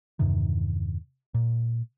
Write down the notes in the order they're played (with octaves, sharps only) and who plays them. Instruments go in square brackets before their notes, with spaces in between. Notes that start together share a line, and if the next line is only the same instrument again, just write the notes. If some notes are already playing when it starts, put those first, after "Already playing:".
[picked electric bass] E2 G2 C3 D#3
A#2